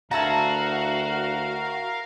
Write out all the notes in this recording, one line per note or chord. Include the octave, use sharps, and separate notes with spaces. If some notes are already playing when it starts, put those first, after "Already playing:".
D2 E4 F#4 A#4 F5 A5 A#5